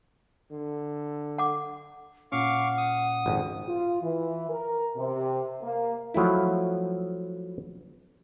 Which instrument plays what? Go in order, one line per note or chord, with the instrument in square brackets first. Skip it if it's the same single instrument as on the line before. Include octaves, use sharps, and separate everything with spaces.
[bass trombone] D3
[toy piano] F#5 D6
[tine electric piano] A#2 C#4 [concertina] F5 C#6 D6 [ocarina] F#5
[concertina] D#6
[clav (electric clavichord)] G#1 F2
[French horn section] F4
E3
A#4
C3
A#3
[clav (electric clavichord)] F3 F#3 A3 E4